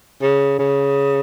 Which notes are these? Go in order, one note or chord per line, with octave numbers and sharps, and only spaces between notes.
C#3
C#3